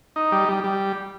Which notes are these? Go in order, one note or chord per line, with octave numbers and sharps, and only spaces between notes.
D#4
G3
G3
G3